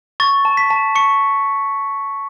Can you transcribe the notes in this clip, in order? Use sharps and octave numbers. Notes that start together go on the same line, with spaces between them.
C#6 A6
A5
B6
A5
C#6 C#7